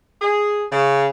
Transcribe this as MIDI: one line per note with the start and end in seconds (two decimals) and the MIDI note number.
0.22 0.64 68
0.72 1.07 49